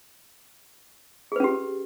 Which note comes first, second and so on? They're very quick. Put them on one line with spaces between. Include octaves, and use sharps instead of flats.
G#4 B4 C#4 G4